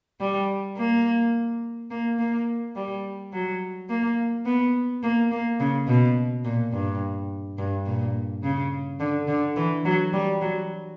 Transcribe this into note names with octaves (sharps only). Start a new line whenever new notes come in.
G3
A#3
A#3
A#3
G3
F#3
A#3
B3
A#3
A#3
C#3
B2
A#2
G2
G2
A#2
C#3
D3
D3
E3
F#3
G3
F#3